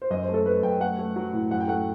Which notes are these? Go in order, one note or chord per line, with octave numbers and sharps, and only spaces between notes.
C5
F#2 D#5
C5
A3
A4
A3 B4
F#2 G5
A3 F#5
A3
F#3
A2
F#2 F#5
G5
A3 F#5